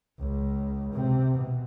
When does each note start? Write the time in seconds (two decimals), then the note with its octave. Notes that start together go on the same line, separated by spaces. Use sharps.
0.19 C#2
0.93 C3
1.34 B2